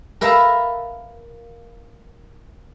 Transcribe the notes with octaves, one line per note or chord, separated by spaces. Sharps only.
A#4 B4 E5 F5 A5 A#5